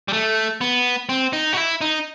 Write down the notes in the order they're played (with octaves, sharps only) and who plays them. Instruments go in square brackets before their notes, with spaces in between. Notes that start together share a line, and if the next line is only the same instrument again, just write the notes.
[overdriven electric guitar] G3
A3
B3
C4
D#4
F#4
E4
D#4